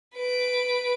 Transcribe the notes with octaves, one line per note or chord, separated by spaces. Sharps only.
B4 D7